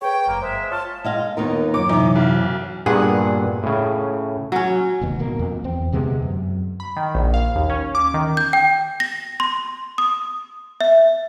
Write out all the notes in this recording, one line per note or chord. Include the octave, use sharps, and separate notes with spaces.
G#4 B4 C#5 G5
G1 F#2 A#3
G#3 C5 E5
F4 C#5 A5 C#6 F6
G#3 D#5 F5
D#2 B3 D#4 F4 A#4
F#2 B2 C#5 D6
C3 E3 D#4
B1
G2 A#2 B3 G#4 F#5
A2 C#3
F#3 C#4
F1 D#2 B2
D1 B2 A#3
F2
E2 C4
D2 C3 G#3 B3
F#2
B5
D#3
A#1
F5
D#2
C#4
D6
D#3
G6
G5
A#6
C6
D#6
E5